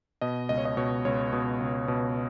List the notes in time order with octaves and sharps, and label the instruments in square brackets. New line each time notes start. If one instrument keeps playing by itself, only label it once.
[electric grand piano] B2 D#5
C#2 D#5
C#5
D#5
B2 C#5
C#2 C#5
B2
C#2
B2